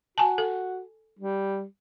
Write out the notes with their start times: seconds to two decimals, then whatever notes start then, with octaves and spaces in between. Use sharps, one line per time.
0.18 F#4 G#5 A5
0.38 A4
1.19 G3